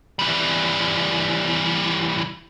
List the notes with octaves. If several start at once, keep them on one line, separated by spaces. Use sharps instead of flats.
E3 G3